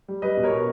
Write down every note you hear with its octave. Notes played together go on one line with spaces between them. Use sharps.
G3
G3 B4 D#5
B2
A#4 C#5
B2